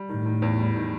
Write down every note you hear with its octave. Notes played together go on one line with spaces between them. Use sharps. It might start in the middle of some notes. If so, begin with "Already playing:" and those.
Already playing: G3
A2 D#3
D#3
E2
G3
D#3